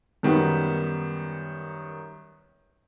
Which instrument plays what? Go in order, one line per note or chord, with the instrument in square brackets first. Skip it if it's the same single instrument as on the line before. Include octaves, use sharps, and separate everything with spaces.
[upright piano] F#2 D#3 G3 B3